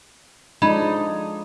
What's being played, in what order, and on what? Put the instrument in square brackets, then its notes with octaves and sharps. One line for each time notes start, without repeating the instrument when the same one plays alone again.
[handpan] F3 G#3 D4 [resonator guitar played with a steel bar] D#4 [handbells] D#5 [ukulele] B5